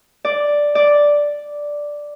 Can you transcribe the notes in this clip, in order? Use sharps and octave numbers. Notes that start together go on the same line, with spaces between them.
D5
D5